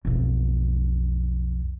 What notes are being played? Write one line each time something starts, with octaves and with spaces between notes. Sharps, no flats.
B1 F2